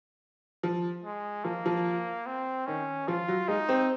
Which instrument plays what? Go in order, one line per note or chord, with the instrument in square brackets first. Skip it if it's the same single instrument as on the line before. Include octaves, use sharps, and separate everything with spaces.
[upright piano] F3
[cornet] G#3
[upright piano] F3 [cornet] A#3
[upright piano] F3
[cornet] C4
[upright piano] D#3 [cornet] C#4
[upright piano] F3 [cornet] F4
[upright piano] F#3
[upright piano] G#3 [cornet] D#4
[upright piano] C4